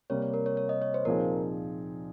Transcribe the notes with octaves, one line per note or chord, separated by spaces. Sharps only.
C3 G3 A#3 C#5
C#5
A#4
C#5
C#5
D#5
C#5
C5
A#2 F3 C4 D#4 G#4 A#4